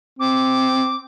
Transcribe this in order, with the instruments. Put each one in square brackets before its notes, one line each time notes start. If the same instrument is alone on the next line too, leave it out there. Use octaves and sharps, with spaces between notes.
[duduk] C4 [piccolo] D6